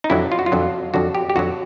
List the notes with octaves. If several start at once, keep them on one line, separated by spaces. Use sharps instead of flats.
D#4
F2 D3 F#3 E4
F4
F#4
F4
F2 D3 F#3
F2 D3 F#3 F#4
G4
G4
F2 D3 F#3 F#4